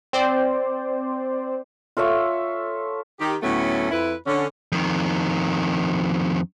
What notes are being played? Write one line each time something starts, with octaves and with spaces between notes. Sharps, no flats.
C4 C5 D5
F4 A4 C#5 E5
D#3 G4
D2 A2 F#3 A3 B3 C#4
F2 E4 B4
D3 C#4
F2 D#3